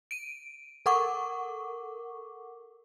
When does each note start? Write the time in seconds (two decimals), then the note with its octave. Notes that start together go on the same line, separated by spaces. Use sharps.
0.11 D7 D#7
0.86 A4 A#4 F#5 C#6 D6